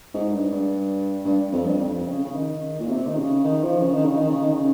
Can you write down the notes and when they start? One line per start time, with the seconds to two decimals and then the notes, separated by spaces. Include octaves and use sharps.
0.14 G#2
0.32 G2
0.51 G2
1.25 G2
1.52 F2
1.65 G2
1.79 F2
2.07 C#3
2.24 C#3
2.35 D#3
2.80 A#2
2.89 C3
3.07 D#3
3.17 C#3
3.44 D#3
3.62 F3
3.81 C#3
3.94 D#3
4.05 C#3
4.16 D#3
4.29 C#3
4.41 D#3
4.53 C#3